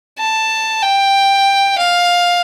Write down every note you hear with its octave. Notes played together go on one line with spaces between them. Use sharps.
A5
G5
F5